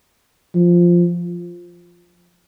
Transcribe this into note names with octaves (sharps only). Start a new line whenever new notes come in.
F3